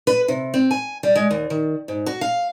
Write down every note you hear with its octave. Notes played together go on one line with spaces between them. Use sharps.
B4
C3
C4
G#5
G3
G#3
D#2
D#3
G#2
F#4
F5